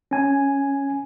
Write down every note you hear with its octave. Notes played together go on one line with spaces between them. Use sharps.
C#4 G#5